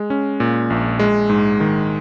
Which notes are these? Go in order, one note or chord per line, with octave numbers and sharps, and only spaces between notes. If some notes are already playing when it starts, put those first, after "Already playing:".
Already playing: G#3
C#4
A#2
A#1
G#3
G#2
D#3